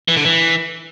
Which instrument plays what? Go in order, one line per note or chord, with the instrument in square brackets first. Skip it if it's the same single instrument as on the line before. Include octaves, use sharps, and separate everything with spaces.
[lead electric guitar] E3
D3
E3